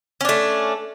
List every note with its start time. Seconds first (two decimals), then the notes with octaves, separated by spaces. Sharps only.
0.21 C#4
0.25 D4
0.29 A3